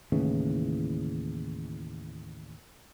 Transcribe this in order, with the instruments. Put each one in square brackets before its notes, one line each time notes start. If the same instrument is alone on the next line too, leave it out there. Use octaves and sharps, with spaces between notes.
[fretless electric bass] D#2 A2 C#3 E3